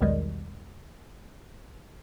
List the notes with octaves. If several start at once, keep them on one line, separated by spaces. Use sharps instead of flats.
B1 E2 B2 D#3 G3 G#3